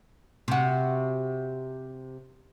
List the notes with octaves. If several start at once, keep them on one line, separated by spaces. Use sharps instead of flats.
C3 F#4